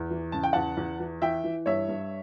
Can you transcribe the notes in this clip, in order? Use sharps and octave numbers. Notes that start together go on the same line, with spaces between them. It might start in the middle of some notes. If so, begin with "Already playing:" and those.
Already playing: E2
E3
C#3 A5
G5
E2 F#5 A5
E2
E3
E3 E5 G5
E3
G2 C#5 E5
G2